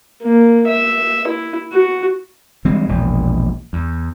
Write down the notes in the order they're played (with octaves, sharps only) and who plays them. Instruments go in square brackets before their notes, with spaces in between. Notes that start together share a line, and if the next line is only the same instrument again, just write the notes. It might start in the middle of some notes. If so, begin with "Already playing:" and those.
[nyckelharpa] A#3
E5
E4
F#4
[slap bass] E3 G3 G#3 C4
E1 A#1
E2